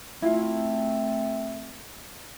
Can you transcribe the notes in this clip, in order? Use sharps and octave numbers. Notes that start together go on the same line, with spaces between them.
A3 C4 E4 F4